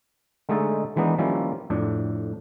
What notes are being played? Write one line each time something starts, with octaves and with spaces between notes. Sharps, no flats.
D3 G#3 A3 D#4 G#4 A4
D#3 E3 G#3 B3 D4 D#4
D#3 F3 G3 A#3 C#4 E4
F2 A2 D4